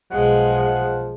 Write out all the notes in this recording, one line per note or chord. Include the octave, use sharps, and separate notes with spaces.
B1 B2 F3 G#3 F#5